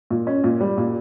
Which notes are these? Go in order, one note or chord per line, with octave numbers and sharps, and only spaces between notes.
A#2
C#4
A#2
G3
A#2